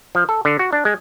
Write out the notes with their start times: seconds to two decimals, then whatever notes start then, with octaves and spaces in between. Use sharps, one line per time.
0.15 F3
0.29 A4
0.45 D3
0.59 F#4
0.73 D4
0.85 G#3